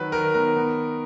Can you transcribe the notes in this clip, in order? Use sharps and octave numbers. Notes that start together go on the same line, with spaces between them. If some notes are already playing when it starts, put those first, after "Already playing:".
Already playing: D#3 F#3 B4
D#3 A#4
B3 A#4
B3